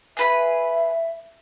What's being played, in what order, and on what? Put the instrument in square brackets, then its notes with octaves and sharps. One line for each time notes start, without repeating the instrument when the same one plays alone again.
[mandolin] G#4 B4 B5 [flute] E5